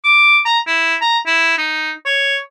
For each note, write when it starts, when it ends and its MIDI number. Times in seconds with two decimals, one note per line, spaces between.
0.04 0.39 86
0.45 0.59 82
0.67 0.96 64
1.02 1.18 82
1.27 1.57 64
1.58 1.93 63
2.06 2.37 73